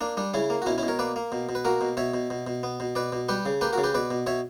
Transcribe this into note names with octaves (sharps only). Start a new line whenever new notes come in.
A#3 D4
G3 D4
C#3 C#4 E4
A#3
F#4
B2 C#4 E4
C#4 E4
B2
A#4 C#5
A#3 B4 D5
A#3
B2
B2
B4
A#3 F#4 A#4
B2
B2 C#5 E5
B2
B2
B2
B3
B2
B2 B4 D5
B2
G3 G4 B4
C#3
A#3 G4 B4
F#4 A#4
C#3
G4 B4
B2 B4 D5
B2
B2 C#5 E5